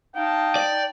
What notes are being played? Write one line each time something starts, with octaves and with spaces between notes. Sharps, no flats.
D#4 F5 G5 A5
D5